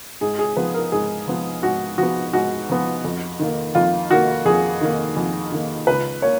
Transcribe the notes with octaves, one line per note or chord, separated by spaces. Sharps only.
G#2 G#4
G#4
F3 B3 B4
A#4
G#2 G#4
F3 B3
G#2 F#4
F3 B3 F#4
G#2 F#4
F3 B3
F2
D#3 A#3
F2 F4
D#3 A#3 F#4
F2 G#4
D#3 A#3
F2
D#3 A#3
C#2 B4
A#3 C#5